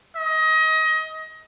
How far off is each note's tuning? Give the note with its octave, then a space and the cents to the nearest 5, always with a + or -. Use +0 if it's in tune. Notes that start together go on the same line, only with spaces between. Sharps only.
D#5 +25